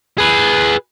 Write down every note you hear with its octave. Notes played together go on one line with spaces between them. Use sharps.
G#4 B4